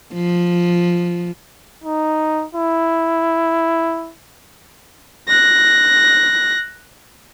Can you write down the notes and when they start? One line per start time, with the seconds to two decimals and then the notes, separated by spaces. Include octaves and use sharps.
0.12 F3
1.84 D#4
2.55 E4
5.28 F#6 A#6